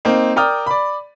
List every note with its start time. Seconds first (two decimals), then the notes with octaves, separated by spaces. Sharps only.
0.05 A#3 C4 D#4
0.36 A#4 D5 G5 A#5 D#6 F6
0.66 D5 B5